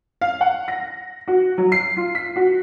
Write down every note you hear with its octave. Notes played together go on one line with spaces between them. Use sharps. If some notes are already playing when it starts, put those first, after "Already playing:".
F5
F#5
A#6
F#4
F#3
C7
F4
B6
F#4